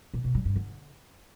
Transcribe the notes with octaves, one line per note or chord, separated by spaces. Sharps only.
A#2
B2
G3
G2
D3